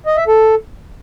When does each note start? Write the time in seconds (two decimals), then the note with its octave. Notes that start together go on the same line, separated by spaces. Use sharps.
0.06 D#5
0.17 E5
0.28 A4